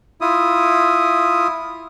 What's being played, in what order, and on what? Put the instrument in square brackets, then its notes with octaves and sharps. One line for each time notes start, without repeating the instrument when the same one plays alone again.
[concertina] E4 F4 D#6